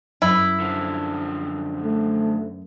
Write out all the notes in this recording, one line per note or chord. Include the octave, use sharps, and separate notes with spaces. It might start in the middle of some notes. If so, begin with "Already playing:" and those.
F#2 E4
D3 F3
A3